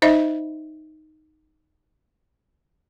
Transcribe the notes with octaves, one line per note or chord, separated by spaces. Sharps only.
D#4 C5 D#5 E5